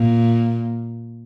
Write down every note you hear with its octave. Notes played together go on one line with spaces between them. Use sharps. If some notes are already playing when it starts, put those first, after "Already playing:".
Already playing: A#2